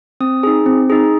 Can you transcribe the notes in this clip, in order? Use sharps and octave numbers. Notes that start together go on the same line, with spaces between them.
C4 D#6
D#4 G#4
C4
D#4 G#4